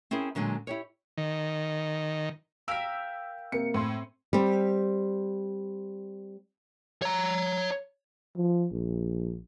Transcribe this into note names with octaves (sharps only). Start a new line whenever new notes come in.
C4 C#4 E4 G#4 A#4
A#2 D3 F#3 G#3 C4
E4 G4 C#5
D#3
A#4 F5 G5 E6 B6
C3 A#3 C#7
A2 C4 C6
G3 C4
C#5 A#5
F3
A#1